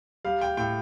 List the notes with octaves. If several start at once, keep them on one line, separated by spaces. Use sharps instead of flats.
G3 F5
G5
A2 G5